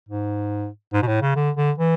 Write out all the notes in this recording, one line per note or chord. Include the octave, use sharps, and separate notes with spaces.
G#2
G#2
B2
A2
C#3
D3
D3
E3